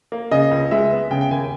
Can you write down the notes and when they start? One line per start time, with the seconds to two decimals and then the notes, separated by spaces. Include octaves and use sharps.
0.12 A#3
0.31 C#3 D#5
0.51 C#2
0.71 G#3 E5
0.91 B3
1.11 C#3 G5
1.21 G5
1.31 D#2 G#5